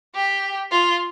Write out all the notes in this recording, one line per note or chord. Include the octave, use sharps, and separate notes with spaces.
G4
F4